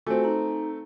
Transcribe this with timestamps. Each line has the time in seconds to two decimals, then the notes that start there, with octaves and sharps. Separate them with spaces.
0.07 A3 C4 F4 F#4 G#5
0.24 D#4 A#5